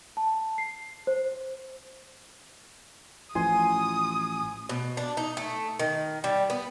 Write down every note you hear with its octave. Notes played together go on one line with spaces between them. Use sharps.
A5
C7
C5
A1 E3 F3 G#5 C6 D#6
B2
D4
D#4
A3
D#3
G3
B3